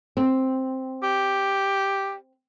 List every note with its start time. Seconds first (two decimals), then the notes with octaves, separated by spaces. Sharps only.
0.17 C4
1.03 G4